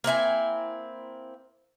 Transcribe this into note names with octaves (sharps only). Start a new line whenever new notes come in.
A#3 C4 E4 G#5